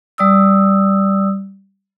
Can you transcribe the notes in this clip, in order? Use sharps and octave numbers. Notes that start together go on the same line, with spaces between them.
G3 D5 D#6 E6